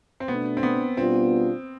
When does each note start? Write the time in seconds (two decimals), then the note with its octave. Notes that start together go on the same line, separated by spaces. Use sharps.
0.20 C4
0.28 B2 A3 B3 D4
0.57 C4
0.63 B3
0.97 B2 G3 B3 C4 D4 F4